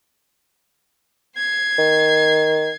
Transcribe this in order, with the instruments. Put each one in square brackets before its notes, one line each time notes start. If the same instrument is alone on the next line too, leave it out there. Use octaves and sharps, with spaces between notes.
[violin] G#6 C7
[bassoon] D#3